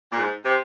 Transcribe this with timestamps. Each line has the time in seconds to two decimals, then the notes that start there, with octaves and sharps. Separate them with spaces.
0.12 A#2
0.18 G#2
0.45 C3